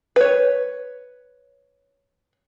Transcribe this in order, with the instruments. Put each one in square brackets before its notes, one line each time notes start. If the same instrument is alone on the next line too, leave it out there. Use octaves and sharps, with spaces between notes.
[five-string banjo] B4 C#5